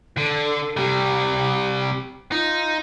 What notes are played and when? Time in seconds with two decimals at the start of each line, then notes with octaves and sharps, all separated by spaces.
0.17 D3 A4
0.77 C3 G3 G4
2.32 D#4 F4